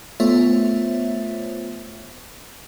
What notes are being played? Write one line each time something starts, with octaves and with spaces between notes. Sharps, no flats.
A3 B3 F4 C5 C#5 E5